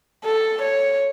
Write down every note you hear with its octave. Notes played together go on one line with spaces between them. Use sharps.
A4
C#5